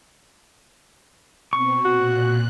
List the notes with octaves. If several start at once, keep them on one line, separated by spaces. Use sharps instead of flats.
B2 C4 C#6
A#2 F#4 F#6